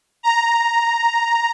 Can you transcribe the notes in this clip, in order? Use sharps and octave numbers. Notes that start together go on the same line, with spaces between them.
A#5